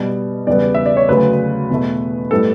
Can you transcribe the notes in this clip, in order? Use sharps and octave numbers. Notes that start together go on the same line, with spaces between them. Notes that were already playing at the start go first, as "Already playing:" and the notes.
Already playing: B2 G3 B3
E2 C#3 G3 B3 D5
E5
D5
C#5
D2 C#3 F#3 B3 B4
E2 B2 A3
A2 G3 B3 A4